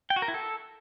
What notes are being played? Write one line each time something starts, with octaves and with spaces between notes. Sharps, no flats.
G5
F#4
A#4
E4
A4